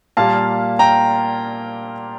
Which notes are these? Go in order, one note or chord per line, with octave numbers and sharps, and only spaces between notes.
A#2 G3 A#3 F5 A5
G5 A#5